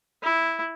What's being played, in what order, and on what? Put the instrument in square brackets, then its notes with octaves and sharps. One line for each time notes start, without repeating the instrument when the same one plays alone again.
[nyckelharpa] E4